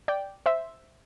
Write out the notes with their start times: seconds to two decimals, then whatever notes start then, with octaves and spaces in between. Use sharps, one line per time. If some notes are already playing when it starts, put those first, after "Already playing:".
0.08 D5 G5
0.46 C5 E5